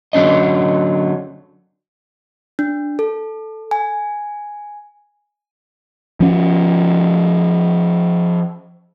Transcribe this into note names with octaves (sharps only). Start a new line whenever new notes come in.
D3 F#3 C#4 D4 D#5
D4
A4
G#5
F3 C#4